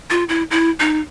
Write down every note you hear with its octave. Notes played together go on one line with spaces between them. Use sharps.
F4
E4
E4
D#4